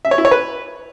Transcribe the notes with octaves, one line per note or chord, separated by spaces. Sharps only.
E5
C#5
E4
C#5
B4